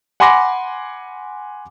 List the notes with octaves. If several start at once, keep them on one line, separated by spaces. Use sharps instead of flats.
F#5 G#5 B5 C6 D6 A#6